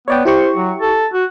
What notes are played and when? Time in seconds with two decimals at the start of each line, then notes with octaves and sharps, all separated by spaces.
0.08 B3 C#5 D5 G5
0.25 E4 G4 C5 C#6
0.55 F#3
0.81 A4
1.13 F#4